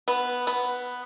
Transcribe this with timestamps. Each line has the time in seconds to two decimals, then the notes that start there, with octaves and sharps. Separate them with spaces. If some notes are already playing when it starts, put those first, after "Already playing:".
0.08 B3
0.47 B3